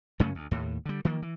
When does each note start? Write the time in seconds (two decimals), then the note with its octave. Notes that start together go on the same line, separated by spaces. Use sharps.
0.20 F#2 C#3 A3 C#4
0.35 D2
0.51 D#2 A2
0.86 D3 G3
1.05 D#3 F3 A#3
1.22 E3